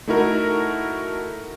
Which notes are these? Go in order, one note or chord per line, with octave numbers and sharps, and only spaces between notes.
A3 D#4 E4 F#4 A#4